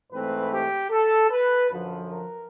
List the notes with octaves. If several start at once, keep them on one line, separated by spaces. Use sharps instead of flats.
G#2 E3 A3 C4 B4
G4
A4
B4
F#2 D3 F3
A#4